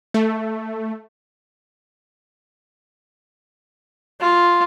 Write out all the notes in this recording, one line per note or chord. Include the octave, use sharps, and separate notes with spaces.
A3
F4